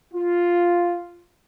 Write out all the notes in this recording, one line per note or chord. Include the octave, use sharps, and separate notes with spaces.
F4